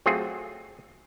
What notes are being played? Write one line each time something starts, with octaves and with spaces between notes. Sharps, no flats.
F#3 A3 C4 F4 G#4